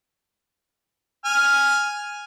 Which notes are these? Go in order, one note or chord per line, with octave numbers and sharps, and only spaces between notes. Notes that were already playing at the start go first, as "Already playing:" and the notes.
G#5 F6